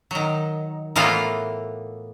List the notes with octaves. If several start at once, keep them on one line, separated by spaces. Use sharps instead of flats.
D#3 F#3
A2 E3 A#3 B3 F4 F5